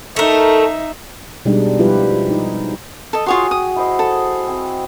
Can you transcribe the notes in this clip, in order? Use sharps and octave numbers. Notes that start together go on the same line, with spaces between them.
A3 D#4 A#4 E5
B2 G3 G#3 D4 D#4
F3 G3 E4 F4 G4 B4
D#4
A4 D#5
F4 F#4 G#4 C#5 G5 C6
D#6
E4 C5 D#5
A4
C4